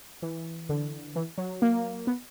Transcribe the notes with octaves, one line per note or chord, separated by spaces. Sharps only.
E3
D3
E3
F#3
A#3
B3